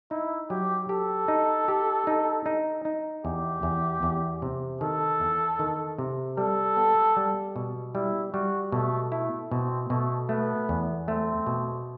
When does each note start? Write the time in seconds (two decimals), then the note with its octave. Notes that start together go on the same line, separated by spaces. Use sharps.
0.11 D#4 E4
0.50 F#3 G4
0.89 G4 A4
1.28 D#4
1.68 G4
2.07 D#4
2.46 D#4
2.85 D#4
3.24 E2 G4
3.63 E2
4.03 E2
4.42 C3
4.81 D#3 A4
5.20 E2
5.59 D#3
5.98 C3
6.37 G3 A4
6.77 B3
7.17 G3
7.56 B2
7.95 G3 E4
8.33 G3 F#4
8.72 B2 A3
9.12 A3 E4
9.51 B2 C4
9.90 B2 A3
10.29 A3 B3
10.69 E2
11.08 A3 C4
11.47 B2